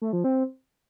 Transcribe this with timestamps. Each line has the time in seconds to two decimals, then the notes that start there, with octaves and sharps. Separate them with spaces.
0.02 A3
0.13 F3
0.24 C4